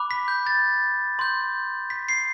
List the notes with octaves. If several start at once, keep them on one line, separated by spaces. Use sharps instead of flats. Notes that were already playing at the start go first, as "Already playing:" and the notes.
Already playing: B5 D6 F#6
B6
G6
A6
C6 G6
B6
C7